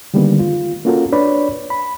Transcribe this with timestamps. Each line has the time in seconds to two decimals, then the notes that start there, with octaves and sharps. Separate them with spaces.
0.14 D3 D#3 G3 G#3 A#3 B3
0.39 F4
0.85 A#3 C#4 F4 F#4 A4 A#4
1.12 D4 B4 C#5 D5 B5
1.70 B5